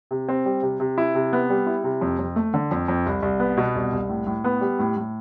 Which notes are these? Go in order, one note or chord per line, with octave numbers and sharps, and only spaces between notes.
C3
C4
G3
C3
C3
E4
C3
B3
G3
E4
C3
F2
F2
A3
D3
F2
F2
C2
C2
B3
B2
C2
C2
A2
A2
B3
G3
A2
A2